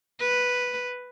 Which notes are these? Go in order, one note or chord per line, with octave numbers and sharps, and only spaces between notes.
B4